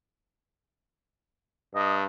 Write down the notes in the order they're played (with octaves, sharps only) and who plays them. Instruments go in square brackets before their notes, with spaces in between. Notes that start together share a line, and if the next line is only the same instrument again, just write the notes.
[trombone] G2 [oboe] D#5